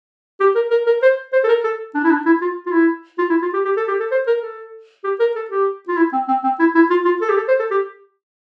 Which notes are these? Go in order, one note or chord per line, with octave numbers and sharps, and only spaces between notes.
G4
A#4
A#4
A#4
C5
C5
A4
A#4
A4
D4
E4
D4
E4
F4
F4
E4
F4
E4
F4
G4
G4
A4
G4
A4
C5
A#4
A4
G4
A#4
A4
G4
F4
E4
C4
C4
C4
E4
E4
F4
F4
A4
G4
A4
C5
A4
G4